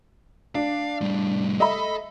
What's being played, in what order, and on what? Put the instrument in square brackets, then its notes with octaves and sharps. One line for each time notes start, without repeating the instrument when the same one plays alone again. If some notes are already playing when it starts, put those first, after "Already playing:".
[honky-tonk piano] D4 [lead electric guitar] F5
[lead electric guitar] A2 G3
[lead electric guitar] A4 [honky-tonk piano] D#5 E5 B5